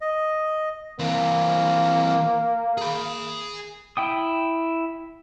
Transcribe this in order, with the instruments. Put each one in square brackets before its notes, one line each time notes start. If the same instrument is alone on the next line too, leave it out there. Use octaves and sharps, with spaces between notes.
[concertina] D#5
[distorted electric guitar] E3 C4 [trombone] A#3
[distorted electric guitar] G#4 B5
[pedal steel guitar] E4 G5 D#6